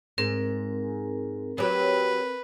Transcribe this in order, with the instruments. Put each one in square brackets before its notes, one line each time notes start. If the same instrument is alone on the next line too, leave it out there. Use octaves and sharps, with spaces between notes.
[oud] G#2 [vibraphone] C4 A#4
[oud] F#3 G4 [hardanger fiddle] B4